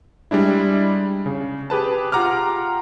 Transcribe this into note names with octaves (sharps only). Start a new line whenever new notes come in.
G3 G#3 D4 E4
C#3
G4 G#4 B4 A5
F4 G4 F#5 A#5 D6 F6